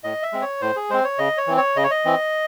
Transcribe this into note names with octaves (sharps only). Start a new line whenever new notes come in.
A2 D#5
E5
G#3 C4
C#5
A2 C5
G#4
G#3 C4 C5
C#5
C#3 D#5
C#5
E3 C4
C#5
C#3 D#5
C#5
D#5
E3 C4